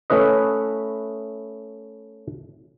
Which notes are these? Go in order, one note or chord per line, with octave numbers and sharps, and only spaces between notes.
A3 C#4 E4 B4 D#5